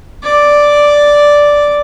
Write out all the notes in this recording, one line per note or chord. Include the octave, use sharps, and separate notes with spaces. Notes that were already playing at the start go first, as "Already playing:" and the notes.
D5